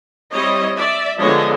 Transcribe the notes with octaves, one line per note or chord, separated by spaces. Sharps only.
G3 C4 E4 C#5 D#5
D5 E5
D3 F3 G#3 B3 D4 C#5 D#5